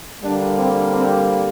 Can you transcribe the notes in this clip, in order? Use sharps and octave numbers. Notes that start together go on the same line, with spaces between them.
D3 G3 A#3 D4
C4
C4